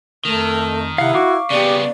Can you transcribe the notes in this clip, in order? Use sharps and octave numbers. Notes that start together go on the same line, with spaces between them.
F2 D#3 A3
C3 E4 F5 F#5
F#4 F5 C#6 D6
C#3 B3 G4 D5